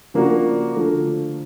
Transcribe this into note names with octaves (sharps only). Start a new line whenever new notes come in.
C#3 F3 A#3 D4 F#4
D3 F3 A3